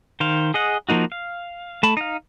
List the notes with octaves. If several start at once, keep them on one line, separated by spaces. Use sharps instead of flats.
D#3 C5 F5
G#4 D#5 F#5
F3 A#3 D#4 F#4
F5
A3 A5 B5
D#4 F5